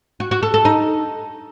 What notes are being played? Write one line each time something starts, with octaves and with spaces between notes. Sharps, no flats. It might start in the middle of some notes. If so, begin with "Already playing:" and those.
F#4
F#4
A4
A4
D#4